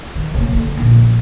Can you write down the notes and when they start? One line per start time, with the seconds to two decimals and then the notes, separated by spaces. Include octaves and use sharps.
0.15 D#3
0.34 C#3 A#3
0.52 D3
0.77 A#1